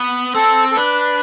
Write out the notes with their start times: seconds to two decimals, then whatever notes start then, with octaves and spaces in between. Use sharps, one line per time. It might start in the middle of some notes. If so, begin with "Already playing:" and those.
Already playing: B3
0.34 C4 A4
0.72 A4
0.76 D4 B4